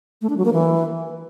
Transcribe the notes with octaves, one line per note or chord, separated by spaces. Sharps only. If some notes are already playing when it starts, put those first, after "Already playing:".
A3
D4
F#3
A#3
E3